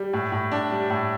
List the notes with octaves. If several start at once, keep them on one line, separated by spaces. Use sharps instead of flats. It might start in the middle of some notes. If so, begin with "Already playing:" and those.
Already playing: G3
A2
A2
D4
G3
A2